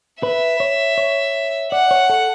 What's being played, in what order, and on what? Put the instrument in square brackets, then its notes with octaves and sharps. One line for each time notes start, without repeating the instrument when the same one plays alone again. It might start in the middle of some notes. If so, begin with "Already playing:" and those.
[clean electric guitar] B4 [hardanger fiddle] E5
[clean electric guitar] C#5
C#5
[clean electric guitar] D5 [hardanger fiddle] F#5
[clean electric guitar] C#5
A4